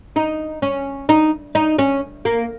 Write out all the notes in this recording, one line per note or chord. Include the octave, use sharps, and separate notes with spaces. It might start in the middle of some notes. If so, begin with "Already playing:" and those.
D#4
C#4
D#4
D#4
C#4
A#3